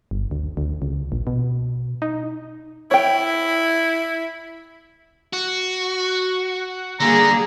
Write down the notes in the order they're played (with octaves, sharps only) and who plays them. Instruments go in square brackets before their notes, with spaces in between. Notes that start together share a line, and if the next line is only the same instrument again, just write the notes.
[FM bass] G1
D2
D2
C#2
A#1
B2
D#4
[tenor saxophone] E4 [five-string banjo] C#5 G5
[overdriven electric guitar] F#4
[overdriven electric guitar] D3 [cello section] G3 A#3 G#4 [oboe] A#5